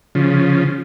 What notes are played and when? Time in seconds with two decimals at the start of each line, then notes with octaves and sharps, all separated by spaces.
0.15 C#3 F3